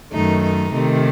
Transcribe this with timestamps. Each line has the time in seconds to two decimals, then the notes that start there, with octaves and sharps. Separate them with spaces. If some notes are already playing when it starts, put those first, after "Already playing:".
0.13 F#2 D#3 A3 D#4
0.43 D#4
0.73 C3 D#3 A3